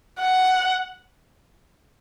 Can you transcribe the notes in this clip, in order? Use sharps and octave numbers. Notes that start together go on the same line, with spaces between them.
F#5